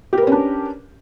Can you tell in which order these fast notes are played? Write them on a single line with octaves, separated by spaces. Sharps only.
G4 A#4 B4 C#4 D4